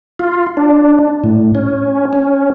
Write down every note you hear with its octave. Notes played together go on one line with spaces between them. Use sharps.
F4
D4
A2
C#4
C#4